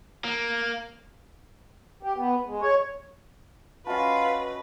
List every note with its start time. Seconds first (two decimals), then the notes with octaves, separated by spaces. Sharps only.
0.24 A#3
2.03 G4
2.16 B3
2.46 G#3
2.61 C#5
3.87 C#4 F4 F#4 B4 D#5 E5 A5